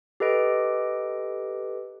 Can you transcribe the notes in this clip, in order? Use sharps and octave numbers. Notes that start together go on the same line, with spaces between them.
G4 A4 B4 D#5 D7